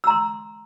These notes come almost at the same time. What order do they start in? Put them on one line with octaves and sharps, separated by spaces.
E6 A#5 C6